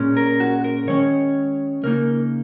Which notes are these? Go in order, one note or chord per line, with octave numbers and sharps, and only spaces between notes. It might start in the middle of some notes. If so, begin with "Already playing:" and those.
Already playing: A#2 G#3 C#4
A#4
F#4
A#4
D#3 G#3 C#4 C#5
C#3 A#3 D#4 A#4